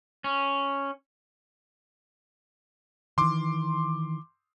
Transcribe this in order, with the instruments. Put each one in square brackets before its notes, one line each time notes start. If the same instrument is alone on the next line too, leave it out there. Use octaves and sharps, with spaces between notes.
[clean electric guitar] C#4
[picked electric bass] D#3 E3 [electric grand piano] C6 D6